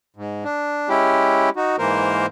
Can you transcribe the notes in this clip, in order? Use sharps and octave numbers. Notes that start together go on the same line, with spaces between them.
G#2
D4
G#3 C#4 E4 G4
D#4 F#4
G#2 E3 A#3 A#4 C5